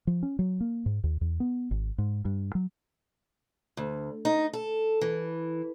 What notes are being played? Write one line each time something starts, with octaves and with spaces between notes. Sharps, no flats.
F3
C#4
F#3
A#3
G#2
D#2
E2
B3
G#1
G#2
G2
F#3
D2
D#4
A4
E3